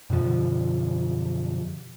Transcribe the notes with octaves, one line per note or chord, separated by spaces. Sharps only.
F#2 B2 D3 F3